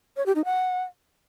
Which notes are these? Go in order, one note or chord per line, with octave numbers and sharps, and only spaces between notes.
C#5
G4
D#4
F#5